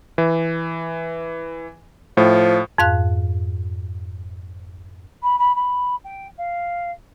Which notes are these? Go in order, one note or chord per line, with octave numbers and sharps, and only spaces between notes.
E3
A2 F3
F2 G#2 F5 F#6
B5
B5
B5
G5
F5